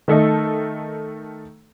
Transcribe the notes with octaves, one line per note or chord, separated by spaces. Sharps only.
D#3 A3 A4 D#5